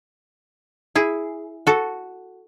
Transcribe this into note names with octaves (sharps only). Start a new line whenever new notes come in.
E4 G#4
F#4 A4